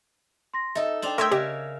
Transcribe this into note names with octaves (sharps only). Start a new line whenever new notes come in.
C6 A#6
D#4 A4 D#5 E5
D4 C5 G5 A5 F7 F#7
A3 A#4 C#5 E5 G5 C6 D#6 E6
C#3 G4 D#5